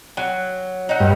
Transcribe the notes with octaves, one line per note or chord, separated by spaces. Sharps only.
F#3
F#3 D#4
G2